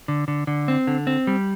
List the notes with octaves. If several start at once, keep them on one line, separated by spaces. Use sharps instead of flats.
D3
D3
D3
C4
D3
C4
G3